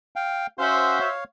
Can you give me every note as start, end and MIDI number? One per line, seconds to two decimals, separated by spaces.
0.16 0.47 77
0.16 0.47 79
0.59 0.99 61
0.59 1.09 66
0.59 1.09 72
0.59 1.09 76
0.59 0.99 77
1.00 1.24 73
1.00 1.24 77